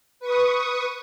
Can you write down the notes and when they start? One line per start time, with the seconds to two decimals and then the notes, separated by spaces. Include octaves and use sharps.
0.20 B4 C#6 D#6